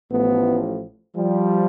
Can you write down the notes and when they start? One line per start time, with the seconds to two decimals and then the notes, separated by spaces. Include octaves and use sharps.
0.11 A1 A2 F3 A3 B3
1.16 F3 G3